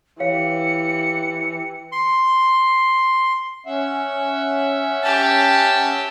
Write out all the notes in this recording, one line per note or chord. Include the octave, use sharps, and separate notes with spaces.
E3 G4 C#5 F5 C#7
C6
C#4 E5 F#5
G4 A5